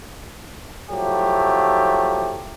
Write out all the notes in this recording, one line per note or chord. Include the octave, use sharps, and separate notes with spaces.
F3 F#3 A3 E4 G4